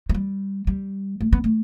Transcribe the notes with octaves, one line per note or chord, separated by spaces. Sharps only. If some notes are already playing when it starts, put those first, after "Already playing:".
A3
G3
G3
A3
B3
A3